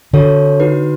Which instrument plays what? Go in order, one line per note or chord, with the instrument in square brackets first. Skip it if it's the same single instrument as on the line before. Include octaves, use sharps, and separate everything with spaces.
[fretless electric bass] D3 [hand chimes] F#4 A4 C#5
[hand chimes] D#4 F#4 B4